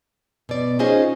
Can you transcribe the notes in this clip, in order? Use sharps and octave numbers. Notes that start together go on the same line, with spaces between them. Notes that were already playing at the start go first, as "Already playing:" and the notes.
B2 D5
C#4 D#4 F4 G#4 C5 D#5